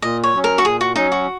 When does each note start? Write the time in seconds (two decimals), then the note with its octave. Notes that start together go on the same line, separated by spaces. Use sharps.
0.02 A#2 D#5
0.23 C#5
0.34 F#3 C#4
0.44 A#4
0.58 F#4
0.65 A#2 G#4
0.81 F#4
0.96 F#3 C#4 D#4
1.12 F#4